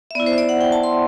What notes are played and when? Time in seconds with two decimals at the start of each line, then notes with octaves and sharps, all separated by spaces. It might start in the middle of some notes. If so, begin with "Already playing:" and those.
0.11 E5
0.15 B3 E4 D5
0.26 C5
0.33 E5
0.38 D5
0.49 F#5
0.61 G5
0.72 A5
0.83 C6